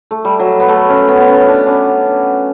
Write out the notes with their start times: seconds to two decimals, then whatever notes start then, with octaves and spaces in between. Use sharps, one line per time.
0.11 A3
0.25 G3
0.40 F#3
0.60 B3
0.68 A3
0.89 C#4
1.08 B3
1.20 B3
1.28 C#4
1.48 D4
1.67 C#4